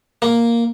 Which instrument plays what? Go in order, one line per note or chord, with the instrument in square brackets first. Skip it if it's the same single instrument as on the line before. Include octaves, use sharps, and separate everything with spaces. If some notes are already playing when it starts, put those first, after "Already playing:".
[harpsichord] A#3